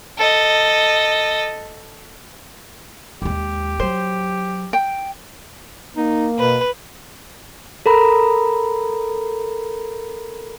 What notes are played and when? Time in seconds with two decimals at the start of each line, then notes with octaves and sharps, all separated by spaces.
0.18 A4 D#5
3.22 D#2 G#3 G4
3.80 F#3 C5
4.73 G5
5.97 A#3 D#4
6.39 B2 B4
7.86 A4 A#4 A#5 B5